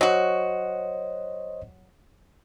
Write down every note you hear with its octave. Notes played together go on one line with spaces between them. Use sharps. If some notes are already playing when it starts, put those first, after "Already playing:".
F#3 F#4 C5 C#5 D#5